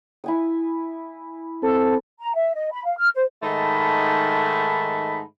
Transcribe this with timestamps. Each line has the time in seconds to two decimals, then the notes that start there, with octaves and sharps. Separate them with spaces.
0.24 E4 G#5 D#6
1.62 C4 A4
2.19 A#5
2.34 E5
2.54 D#5
2.72 B5
2.84 F5
2.97 F6
3.14 C5
3.43 G#2 D#3 A3 D#4 A5 B5